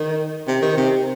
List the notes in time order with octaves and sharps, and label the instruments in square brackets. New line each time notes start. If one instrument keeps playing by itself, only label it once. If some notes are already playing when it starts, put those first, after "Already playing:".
Already playing: [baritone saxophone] D#3
C3
D#3
C3